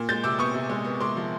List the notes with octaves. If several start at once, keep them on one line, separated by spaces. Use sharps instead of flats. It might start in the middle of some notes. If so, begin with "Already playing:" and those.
Already playing: A#2
G#3 G6 A6
C3 D6 E6
B3 C#6 D#6
C3
G#3
B3
G#3 C6 D6
F3